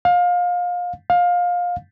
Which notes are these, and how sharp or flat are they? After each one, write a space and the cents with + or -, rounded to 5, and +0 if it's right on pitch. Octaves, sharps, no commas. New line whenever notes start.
F5 +25
F5 +20